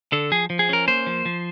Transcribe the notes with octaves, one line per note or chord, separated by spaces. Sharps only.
D3 A4
F3 G#4
F3
G#4
C#4 A#4
A#3 C5
F3
F3